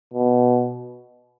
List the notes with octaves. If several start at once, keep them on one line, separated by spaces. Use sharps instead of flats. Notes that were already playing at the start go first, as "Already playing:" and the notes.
B2